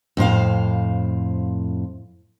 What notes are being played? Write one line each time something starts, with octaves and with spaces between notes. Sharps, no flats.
F2 A2 C5 F5